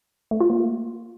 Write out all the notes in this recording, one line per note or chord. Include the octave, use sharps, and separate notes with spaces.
A3
F4
A#3